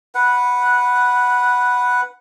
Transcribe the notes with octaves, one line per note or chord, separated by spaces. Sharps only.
B4 F#5